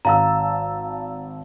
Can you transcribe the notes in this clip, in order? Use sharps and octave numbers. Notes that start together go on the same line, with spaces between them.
G#1 F5 A5 A#5 E6